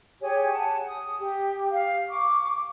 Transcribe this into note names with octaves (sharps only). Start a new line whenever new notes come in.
G4 G#4 C#5 G#5
F#5 G#5 A5
D#6
G4
F5
C#6 D6